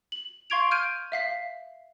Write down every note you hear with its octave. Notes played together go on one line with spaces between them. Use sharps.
F#7
F5 C6 C#6 G#6 D7 F7
F6 G6 G#6 D7 D#7
E5 F5 B6